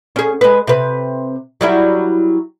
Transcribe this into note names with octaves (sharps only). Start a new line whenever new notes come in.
C#4 G#4
G#3 B4
C3 B4
F#3 G3 E4